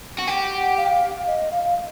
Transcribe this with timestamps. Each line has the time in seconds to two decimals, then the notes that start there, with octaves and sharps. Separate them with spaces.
0.18 F#4
0.27 G4 F#5
0.77 F5
1.27 D#5
1.51 F5